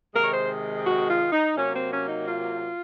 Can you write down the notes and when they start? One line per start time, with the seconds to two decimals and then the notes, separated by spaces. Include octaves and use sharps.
0.14 C3 D#3 G#3 A#4
0.23 C#5
0.32 C5
0.85 F#4
1.08 F4
1.32 D#4
1.56 C3 F#3 A#3 C#4
1.74 C4
1.91 C#4
2.09 D#4
2.27 F4